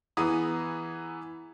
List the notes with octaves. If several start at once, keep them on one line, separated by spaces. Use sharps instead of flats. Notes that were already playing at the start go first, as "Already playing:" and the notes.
E3 B3 G#4 A#5 D#6